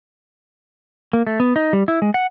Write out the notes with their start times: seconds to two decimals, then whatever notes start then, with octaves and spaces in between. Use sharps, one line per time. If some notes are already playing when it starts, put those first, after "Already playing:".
1.13 A#3
1.27 A3
1.40 B3
1.56 D#4
1.73 G3
1.88 E4
2.02 G#3
2.14 F#5